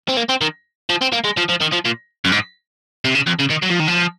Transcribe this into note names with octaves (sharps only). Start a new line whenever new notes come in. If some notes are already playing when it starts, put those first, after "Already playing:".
C4
A#3
C4
D#3
F3
C4
A#3
G#3
F3
F3
D#3
F3
A#2
F#2
G#2
C3
C#3
F2
C#3
D#3
F#3
F3
D#3
F3